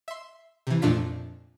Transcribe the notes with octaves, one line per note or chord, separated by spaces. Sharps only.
E5 C6
C3 E3
F2 A#2 A3 D4 F4 B6